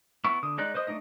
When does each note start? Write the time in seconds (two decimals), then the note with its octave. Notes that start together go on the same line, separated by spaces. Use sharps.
0.24 B3 E4 C#6
0.43 D3 D#6
0.58 G#3 D#4 D5 F#6
0.74 B4 C5 D#5 D#6
0.87 A3 C4 D4 D#4 D#5